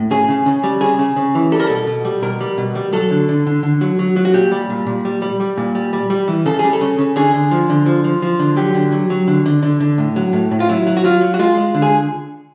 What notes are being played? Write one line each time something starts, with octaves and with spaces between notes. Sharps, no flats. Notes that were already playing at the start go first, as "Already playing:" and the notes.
Already playing: A2
C#3 G#4
C#3
C#3
G3
C#3 G#4
C#3
C#3
E3
G3 A4
A#4
B2 A4
B2
G3
B2 A#4
G3
B2
G3
F#3 A4
D3
D3
D3
D3
F#3
F#3
F#3
F#4
A#2 G4
G3
A#2
A#2
G3
G3
G3
A#2
G3
G3
G3
E3
C#3 A4
G3 G#4
A4
C#3
C#3
D3 G#4
D3
F3
D3
F3
F3
F3
D3
F#3 G4
D3
F#3
F#3
D3
D3
D3
D3
A2
F#3
A2
A2
F4
F#3 E4
F#3
F#4
F#3 F4
F#3
F#4
G#3 F4
G#3
D3
G#4